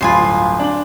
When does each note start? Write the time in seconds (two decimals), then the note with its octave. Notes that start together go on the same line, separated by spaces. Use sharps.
0.01 D1 G1 F4 G#5 B5 C6
0.59 D4 F#7